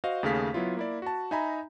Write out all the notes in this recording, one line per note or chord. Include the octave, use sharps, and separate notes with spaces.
F#4 C5 D#5 F5
D#2 C#3 A3 G#4 F5 B6
F#3 B3 E4 F4 C#5
A#3 E4 D5
F#4 A5
D#4 E5 G#5 A#5 B5